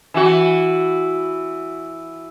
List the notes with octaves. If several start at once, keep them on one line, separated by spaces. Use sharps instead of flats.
E3 F#4